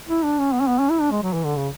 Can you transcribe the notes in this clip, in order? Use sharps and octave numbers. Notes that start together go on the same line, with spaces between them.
E4
D4
C#4
B3
C#4
B3
C#4
E4
D4
G#3
F#3
E3
D3
C#3